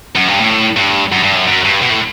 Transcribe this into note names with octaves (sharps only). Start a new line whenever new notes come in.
F#2
G2
A2
G2
F#2
G2
F#2
F#2
G2
B2
A2